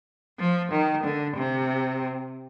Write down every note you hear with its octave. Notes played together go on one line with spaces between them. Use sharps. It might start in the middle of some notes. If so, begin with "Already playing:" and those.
F3
D#3
D3
C3